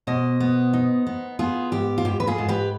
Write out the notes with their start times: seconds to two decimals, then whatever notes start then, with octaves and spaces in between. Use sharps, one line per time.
0.07 B2 C5 D#5
0.40 B3
0.73 D#4
1.07 B3
1.39 B3 F4 G#4
1.72 G#2 G4
1.98 F4
2.05 G#2 G4
2.20 B4
2.27 F4 G#4
2.38 G#2
2.48 G4 B4